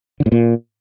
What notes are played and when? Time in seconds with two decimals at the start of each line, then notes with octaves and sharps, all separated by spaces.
0.20 D3
0.26 A2
0.32 A#2